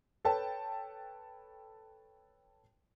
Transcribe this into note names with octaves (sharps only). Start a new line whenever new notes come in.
A4 B4 C#5 G5 A5